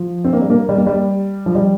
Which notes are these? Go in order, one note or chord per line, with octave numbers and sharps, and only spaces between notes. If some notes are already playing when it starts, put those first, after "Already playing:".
Already playing: F3
C4
A#3
G3
A#3
G3
A#3
G3
F3
G3